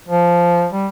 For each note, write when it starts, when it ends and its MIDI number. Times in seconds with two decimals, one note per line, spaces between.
0.08 0.66 53
0.72 0.87 55